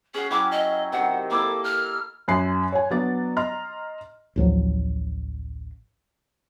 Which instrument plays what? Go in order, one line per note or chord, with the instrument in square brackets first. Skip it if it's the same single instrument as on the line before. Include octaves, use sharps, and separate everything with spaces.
[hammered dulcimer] C#4 F#4 [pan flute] G#4
[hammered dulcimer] F#3 E4 G5 [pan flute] D6
[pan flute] D#5
[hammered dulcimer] C3 D#3 F#3 [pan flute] F#5
[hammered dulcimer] A#3 E4 A4 [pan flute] D6
[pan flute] F6
[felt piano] F#2 G#5 B5 F#6 C7
C#5 G#5
F#3 B3 D4 D5 A6
D#5 A#5 C6 F6
[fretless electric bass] A1 D2 F3 F#3